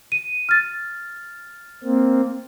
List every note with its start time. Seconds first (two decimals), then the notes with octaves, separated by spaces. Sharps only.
0.12 D#7
0.49 F6 A6
1.83 A#3 C4